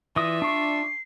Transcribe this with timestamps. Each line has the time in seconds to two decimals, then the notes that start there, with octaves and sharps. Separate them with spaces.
0.16 E3 F4 D5 E5 D#6 A#6
0.42 D4 C#6 C7